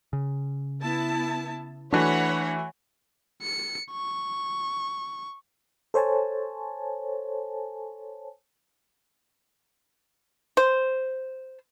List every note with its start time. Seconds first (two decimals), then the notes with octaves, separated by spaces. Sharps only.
0.13 C#3
0.81 B3 E4 A5
1.93 E3 A3 D4 F#4 C#5 F#5 B5
3.42 C#7
3.92 C#6
5.94 A4 C5 C#5 G#5 A5
10.57 C5